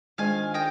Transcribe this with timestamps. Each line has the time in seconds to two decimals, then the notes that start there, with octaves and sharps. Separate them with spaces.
0.18 D#3 G#3 D4 F4 C5 F5 G#5
0.54 D#5 G5